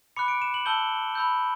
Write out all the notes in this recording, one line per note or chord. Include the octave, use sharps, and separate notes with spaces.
B5 D6 F#6 C#7
D7
E7
F#7
A5 E6 G6 G7
B5 E6 G6